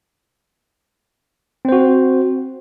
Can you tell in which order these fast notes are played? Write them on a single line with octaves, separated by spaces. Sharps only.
C4 C5 F#4